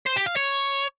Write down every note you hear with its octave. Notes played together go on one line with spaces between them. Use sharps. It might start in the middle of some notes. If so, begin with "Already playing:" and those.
C5
G4
F5
C#5